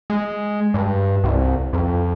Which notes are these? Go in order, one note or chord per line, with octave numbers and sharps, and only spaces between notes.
G#3
G2
C2
F2